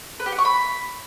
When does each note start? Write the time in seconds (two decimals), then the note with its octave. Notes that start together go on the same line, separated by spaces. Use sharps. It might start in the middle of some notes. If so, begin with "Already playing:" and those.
0.20 B4
0.26 G4
0.32 F#5
0.39 C#6
0.45 B5